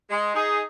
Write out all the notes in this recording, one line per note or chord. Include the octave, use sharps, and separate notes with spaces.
G#3
D#4 G#4